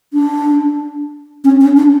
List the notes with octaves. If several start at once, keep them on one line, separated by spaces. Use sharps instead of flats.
D4
C#4
C#4
D4